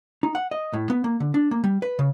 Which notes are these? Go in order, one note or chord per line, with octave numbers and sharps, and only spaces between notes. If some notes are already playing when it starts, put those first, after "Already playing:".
D#4
F#5
D#5
A2
B3
A#3
D3
D4
A#3
G3
B4
C#3